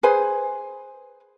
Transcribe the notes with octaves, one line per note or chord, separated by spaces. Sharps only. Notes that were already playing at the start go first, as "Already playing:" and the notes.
G#4 B4 C5 G#5